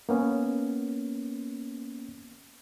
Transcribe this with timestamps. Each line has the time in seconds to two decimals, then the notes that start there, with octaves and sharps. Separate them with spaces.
0.09 A#3 B3 C#4